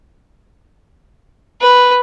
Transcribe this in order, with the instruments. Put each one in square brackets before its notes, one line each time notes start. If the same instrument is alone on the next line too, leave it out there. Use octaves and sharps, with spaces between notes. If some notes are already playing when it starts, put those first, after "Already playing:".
[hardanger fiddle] B4